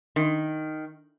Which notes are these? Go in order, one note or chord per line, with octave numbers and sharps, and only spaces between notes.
D#3